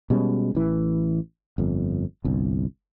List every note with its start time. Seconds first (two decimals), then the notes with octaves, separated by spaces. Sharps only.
0.10 B2 G3 G#3 C#4
0.55 A1 E3
1.58 G1 F2
2.25 G1 C2